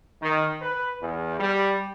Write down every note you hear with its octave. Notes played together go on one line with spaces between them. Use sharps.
D#3
B4
E2
G3